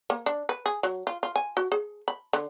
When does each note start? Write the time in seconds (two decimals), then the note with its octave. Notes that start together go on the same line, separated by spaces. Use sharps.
0.10 A#3
0.26 D4
0.49 B4
0.66 G#4
0.83 F#3
1.07 F4
1.23 F4
1.36 G#5
1.57 F#4
1.72 G#4
2.08 B5
2.33 D3